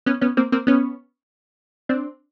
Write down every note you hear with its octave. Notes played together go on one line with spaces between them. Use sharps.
B3 C#4
B3 C#4
A#3 C4
A#3 C4
B3 C#4
C4 D4